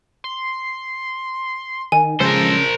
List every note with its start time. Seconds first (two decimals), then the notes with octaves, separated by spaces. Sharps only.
0.24 C6
1.92 D#3 G#5
2.20 C#3 F3 G#3 A4 A#4 C5